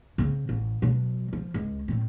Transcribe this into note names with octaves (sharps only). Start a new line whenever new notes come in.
C#3 C4
A1
B2 F#3
F3
C#2
A2 C4